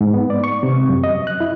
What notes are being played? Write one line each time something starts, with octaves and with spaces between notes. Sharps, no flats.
G#2
B3
D5
C#6
C3
F#2
D#5
F#6
E4